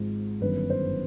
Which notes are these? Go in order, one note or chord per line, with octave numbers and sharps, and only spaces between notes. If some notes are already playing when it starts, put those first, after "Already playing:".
Already playing: G#1 G#2 F3
G1 F#2 D#3 B4
C5